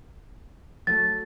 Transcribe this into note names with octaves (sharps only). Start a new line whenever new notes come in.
F#3 A3 A6